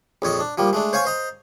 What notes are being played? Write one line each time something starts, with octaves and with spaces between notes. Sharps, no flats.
A#1 F2 C#5 D#5
D4
F3 G3 A#3
G#3 A3 D4
C5 C#5 F5 G#5 C#6
C5 D#5 A#5